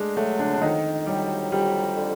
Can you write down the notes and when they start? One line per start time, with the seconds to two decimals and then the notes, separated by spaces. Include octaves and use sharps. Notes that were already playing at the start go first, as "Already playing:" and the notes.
Already playing: G#3 A3 D4
0.17 F#3 A3
0.39 D3 D4
0.54 D4
0.62 F2 D#3 D#4
1.06 F#3 G3 G4
1.52 F2 G3 G4
1.97 D3